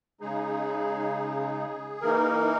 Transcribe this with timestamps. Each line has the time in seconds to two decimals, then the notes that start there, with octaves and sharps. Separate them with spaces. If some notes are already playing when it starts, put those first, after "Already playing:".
0.21 C#3 G#3 D#4 G#4
2.01 E3 A#3 D#4 A#4